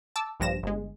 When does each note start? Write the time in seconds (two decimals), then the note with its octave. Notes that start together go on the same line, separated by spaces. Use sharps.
0.16 A5 D6 E6
0.40 A#1 G2 F3 A#6 E7
0.63 G1 G#3